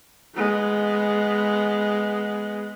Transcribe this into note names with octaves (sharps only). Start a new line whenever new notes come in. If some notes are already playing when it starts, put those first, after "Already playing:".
G#3 B3